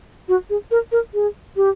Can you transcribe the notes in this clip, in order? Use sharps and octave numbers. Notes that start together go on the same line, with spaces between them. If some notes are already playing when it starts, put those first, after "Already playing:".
F#4
G#4
A#4
A#4
G#4
G4